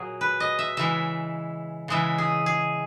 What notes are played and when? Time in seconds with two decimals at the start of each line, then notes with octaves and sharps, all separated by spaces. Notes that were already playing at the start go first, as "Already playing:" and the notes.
Already playing: A#2 F#3 G#4
0.21 B4
0.40 D#5
0.59 E5
0.77 C#3 E3 G#3 E5
1.88 C#3 E3 G#3 E5
2.18 G#4
2.46 G#4